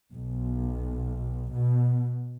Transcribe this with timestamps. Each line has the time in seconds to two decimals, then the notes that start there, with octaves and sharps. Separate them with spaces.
0.11 B1
1.52 B2